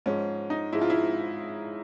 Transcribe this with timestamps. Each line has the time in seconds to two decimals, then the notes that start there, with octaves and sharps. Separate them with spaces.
0.06 G#2 F3 G#3 C#4
0.50 D#4
0.73 G#2 F3 G#3 E4
0.81 F4
0.90 E4